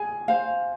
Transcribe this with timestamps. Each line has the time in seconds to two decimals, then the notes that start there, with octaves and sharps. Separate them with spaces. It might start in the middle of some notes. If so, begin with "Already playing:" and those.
Already playing: G#4 G#5
0.28 C5 F5